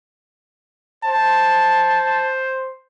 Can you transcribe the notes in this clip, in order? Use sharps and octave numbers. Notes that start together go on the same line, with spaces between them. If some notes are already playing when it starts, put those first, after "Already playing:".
C5 A5